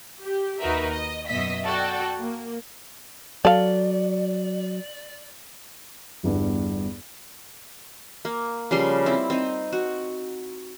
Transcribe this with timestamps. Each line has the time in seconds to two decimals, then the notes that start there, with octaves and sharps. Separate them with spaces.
0.23 G4
0.60 D#2 D#4 F#4 A#4 B4 E5
0.91 D#5
1.29 F#2 B2 D#5 E5 B6
1.65 F#4 A4 D5 G5
2.19 A#3
3.45 F#3 A4 D5 F5
6.23 G1 E2 G2
8.25 A#3
8.71 C#3 F3 G3 C6
9.06 C4 E4
9.30 C4 D#4
9.73 F#4